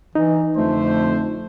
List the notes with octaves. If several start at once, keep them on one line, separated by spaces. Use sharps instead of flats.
E3 D#4
F2 D3 A3 C5